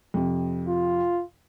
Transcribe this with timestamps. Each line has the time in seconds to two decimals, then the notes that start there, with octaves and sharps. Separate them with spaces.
0.14 F2 C3
0.68 F4